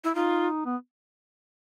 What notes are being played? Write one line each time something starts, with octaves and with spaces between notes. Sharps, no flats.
E4
D#4 F4
B3